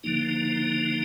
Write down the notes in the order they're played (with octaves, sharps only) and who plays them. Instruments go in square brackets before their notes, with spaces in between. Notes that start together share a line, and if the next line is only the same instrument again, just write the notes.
[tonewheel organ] D3 F3 A#3 D#4